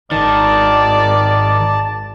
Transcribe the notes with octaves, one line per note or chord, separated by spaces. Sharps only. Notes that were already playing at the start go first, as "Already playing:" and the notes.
G#1 D#3 D5 A5